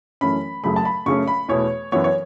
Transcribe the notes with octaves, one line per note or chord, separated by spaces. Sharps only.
F#2 E3 A3 C#4 B5
F#2 C#3 F#3 A3 B5
A5
B5
F#2 C#3 A3 C#4 C#6
B5
E2 B2 A3 C#5
F#2 E3 B3 C#5
C#5